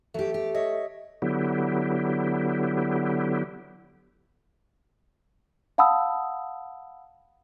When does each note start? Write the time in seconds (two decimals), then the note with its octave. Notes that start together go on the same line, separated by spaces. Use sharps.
0.14 F#3 A3 G4
0.34 G4
0.55 C#5 D#5 E5
1.22 D3 F#3 B3 E4 G4
5.78 F5 F#5 A5 B5 D#6 E6